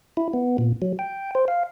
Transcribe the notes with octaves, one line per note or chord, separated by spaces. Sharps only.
E4
B3
A#2
F#3
G5
C5
F5